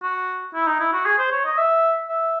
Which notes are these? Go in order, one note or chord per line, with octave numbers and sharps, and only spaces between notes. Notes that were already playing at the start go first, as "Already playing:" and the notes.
F#4
E4
D#4
E4
F#4
G#4
C5
C#5
D#5
E5
E5